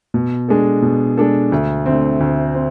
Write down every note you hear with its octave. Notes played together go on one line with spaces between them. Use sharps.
B2
G#3 D4 A4
B2
G#3 D4 A4
D2
D3 A3 C4
D2
C4